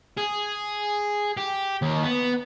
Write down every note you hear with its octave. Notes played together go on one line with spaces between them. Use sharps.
G#4
G4
D#2
B3